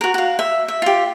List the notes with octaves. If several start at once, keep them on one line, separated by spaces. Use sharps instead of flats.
F#4 A#4
F#4 F5
E5
E5
F4 G4